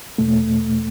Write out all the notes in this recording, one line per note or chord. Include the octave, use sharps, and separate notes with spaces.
E2 B2 A3